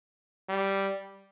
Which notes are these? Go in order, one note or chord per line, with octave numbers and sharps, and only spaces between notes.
G3